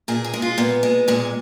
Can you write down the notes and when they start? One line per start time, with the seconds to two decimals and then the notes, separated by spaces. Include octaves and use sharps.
0.08 A#2 G#4
0.24 G#4
0.34 G#3
0.42 F4
0.58 A#2 B3
0.83 G#3
1.08 A#2 G#3